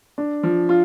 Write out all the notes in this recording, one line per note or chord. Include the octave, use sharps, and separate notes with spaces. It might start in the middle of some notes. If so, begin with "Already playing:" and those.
D4
F3
F4